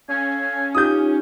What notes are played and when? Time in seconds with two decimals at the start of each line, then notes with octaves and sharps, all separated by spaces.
0.08 C#4 A4 F5 G#5
0.75 D#4 F4 G4 D#6 G6